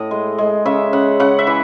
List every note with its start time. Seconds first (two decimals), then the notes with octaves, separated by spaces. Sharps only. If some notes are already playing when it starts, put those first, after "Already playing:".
Already playing: A2 D#5
0.11 G#3
0.38 G#3
0.66 C#3 E5
0.93 C#3 F#5
1.20 C#3 F#5
1.39 E5
1.47 E3